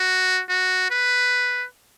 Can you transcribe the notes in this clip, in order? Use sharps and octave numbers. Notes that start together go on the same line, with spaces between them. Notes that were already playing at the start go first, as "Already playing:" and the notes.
Already playing: F#4
F#4
B4